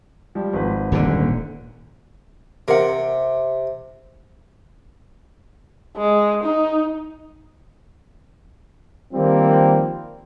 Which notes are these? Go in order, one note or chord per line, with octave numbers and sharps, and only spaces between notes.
F3 G3
G#1 B4
D#1 A#2 D3
C3 A#4 F#5
G#3
D#4
D#3 F3 G3 A#3 C4